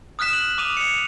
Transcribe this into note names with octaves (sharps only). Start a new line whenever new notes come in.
D#6 F6 F#6 B6 E7
F#6 F#7
D6 D#6 D#7 F7
C#7 F7